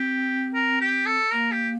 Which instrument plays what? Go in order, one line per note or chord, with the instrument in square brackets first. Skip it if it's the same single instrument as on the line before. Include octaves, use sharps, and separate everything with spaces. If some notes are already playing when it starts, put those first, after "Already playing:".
Already playing: [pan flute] C4 [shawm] G4
[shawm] A#4
G4
A4
[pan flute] A#3 [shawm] A#4
[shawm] G4